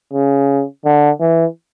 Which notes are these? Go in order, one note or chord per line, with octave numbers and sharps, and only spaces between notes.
C#3
D3
E3